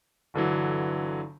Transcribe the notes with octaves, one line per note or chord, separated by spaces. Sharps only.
G1 D3 E3 F#3